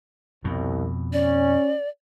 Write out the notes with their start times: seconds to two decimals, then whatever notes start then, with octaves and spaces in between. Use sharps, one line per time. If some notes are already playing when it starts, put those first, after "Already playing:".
0.44 C2 F2 B2
1.13 C#4 D5